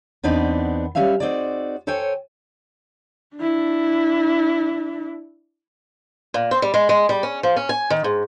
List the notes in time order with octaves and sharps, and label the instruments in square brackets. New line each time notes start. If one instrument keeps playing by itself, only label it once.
[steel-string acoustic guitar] E2 B3 C4 D4 D#4 B4
G3 C#4 B4 E5 F5
C4 D#4 F#4 G#4 D5
A4 C5 C#5 G5 G#5
[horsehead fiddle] D4 E4
[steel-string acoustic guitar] A#2
C4
G3
G#3
G#3
G3
C#4
F3
C#4
G#5
D#3
G#2